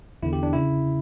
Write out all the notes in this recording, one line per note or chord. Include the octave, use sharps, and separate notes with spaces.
E2 D3 E4
G4
D4
C#3 E4